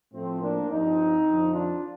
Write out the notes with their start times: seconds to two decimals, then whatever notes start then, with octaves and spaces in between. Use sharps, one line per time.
0.13 A2 F3 A3 C4
0.41 A#3 D4
0.69 G2 F3 C4 D#4
1.26 F2 D3 F3
1.53 D4 F4